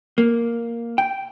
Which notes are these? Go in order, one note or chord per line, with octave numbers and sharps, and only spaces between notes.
A#3
G5